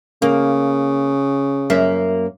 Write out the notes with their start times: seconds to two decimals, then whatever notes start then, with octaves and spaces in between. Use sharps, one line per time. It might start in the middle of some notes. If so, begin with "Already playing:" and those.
0.22 C#3 A#3
1.70 F#2 A#3 E5